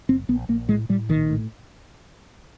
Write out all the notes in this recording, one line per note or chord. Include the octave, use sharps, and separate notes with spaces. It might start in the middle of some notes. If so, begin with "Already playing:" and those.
F#1 C4
A#1 B3
A#1 A#3
A2 G#3
A2 G3
A#1 D#3
A2